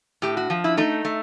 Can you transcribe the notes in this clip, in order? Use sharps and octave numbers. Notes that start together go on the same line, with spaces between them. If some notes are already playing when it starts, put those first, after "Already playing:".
A2 G4
F#4
F3
E4
A3 D#4
A3